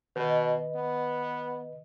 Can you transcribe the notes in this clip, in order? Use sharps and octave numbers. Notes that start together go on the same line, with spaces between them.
B2 D#3 B4 D#5
B3